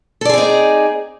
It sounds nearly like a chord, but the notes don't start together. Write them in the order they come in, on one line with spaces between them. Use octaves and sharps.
A4 D5 G#4 C4 D#4